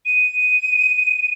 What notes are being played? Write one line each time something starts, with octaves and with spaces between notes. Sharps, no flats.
D#7